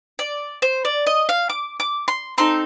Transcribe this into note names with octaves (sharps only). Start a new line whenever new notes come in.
D5
C5
D5
D#5
F5
D6
D6
C6
C4 D#4 A4 C6